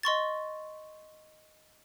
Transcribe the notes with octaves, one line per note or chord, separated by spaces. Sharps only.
D#5 C6 C#6 A6